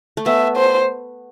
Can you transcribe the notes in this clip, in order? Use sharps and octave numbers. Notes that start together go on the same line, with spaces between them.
A3
B3 E5
C5